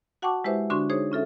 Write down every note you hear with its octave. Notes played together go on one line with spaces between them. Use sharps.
F#4 F#5 G5 A5 C#6 D6
G#3 E4 G4 B4 C5 E5
D3 D4 F#4 C6 C#6
D#4 G#4 C5 C#5
C#4 F4 A4 E5